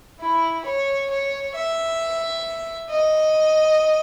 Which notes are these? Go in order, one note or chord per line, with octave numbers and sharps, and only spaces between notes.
E4
C#5
C#5
E5
D#5